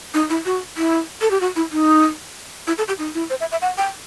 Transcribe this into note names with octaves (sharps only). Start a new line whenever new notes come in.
D#4
E4
F#4
E4
A4
G4
F#4
E4
D#4
E4
A4
G4
D#4
E4
C5
E5
E5
F#5
G5